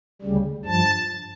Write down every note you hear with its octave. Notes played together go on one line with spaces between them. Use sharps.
D2 C#3 G3
G2 F3 A5